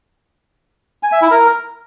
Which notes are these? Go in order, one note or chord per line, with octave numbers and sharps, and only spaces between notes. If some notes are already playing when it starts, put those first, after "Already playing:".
G#5
E5
E4
A#4